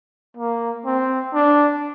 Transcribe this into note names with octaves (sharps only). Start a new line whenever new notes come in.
A#3
C4
D4